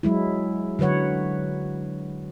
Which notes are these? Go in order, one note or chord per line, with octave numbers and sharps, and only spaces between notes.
F#3 G#3 E4
D3 F#3 B4 C#5 F#5